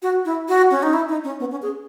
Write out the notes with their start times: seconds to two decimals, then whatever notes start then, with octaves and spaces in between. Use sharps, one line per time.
0.02 F#4
0.25 E4
0.48 F#4
0.71 C#4
0.83 D#4
0.93 E4
1.09 D#4
1.24 C#4
1.40 B3
1.51 C#4
1.62 G#4